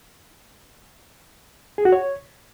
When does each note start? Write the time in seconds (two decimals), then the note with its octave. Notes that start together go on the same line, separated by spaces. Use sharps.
1.78 G#4
1.85 F#4
1.92 C#5